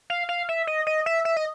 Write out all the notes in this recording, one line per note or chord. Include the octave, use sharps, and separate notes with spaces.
F5
F5
E5
D#5
D#5
E5
E5
D#5